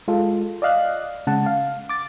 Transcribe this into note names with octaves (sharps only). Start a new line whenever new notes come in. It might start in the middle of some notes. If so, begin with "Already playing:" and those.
G#3 F4 A4
D5 D#5 F5 F#6
C#3 G#3 F#5 A5
F5
D6 A6